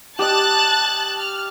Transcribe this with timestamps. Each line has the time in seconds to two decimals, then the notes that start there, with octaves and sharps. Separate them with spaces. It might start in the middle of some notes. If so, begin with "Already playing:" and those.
0.19 G4 D#5 A5 F#6 A6
1.20 F6